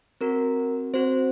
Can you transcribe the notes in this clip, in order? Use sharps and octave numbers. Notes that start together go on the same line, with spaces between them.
C4 F#4 A#4
C4 F#4 C5